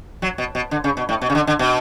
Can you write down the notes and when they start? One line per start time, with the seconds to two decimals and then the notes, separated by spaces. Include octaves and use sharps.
0.22 F#3
0.38 B2
0.55 B2
0.71 D3
0.84 C#3
0.97 B2
1.09 A2
1.22 B2
1.30 C#3
1.35 D3
1.47 D3
1.59 B2